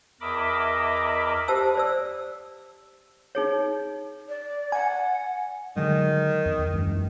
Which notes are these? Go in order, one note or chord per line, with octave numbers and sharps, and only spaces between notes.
E2 A#4 D#5 E5 B5 D6
G4 C5 A5 E6
C5 D5 E6
D#4 G#4 C#5
D5
F#5 G#5
D3 D#3 F#3 G#3
E2
F#2 E3 G#3